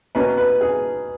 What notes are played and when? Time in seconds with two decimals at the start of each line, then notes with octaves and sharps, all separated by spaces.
0.15 B2 A#3 C#4 B4
0.38 B4
0.61 G#4